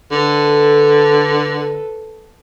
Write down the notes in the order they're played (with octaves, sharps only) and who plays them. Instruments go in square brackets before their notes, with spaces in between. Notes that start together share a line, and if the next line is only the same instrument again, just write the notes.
[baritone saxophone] D3 [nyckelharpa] A4 B4